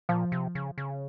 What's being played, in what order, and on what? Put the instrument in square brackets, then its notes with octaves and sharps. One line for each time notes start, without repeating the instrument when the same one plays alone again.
[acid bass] A#2 [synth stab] F3
[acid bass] C3
C#3
C#3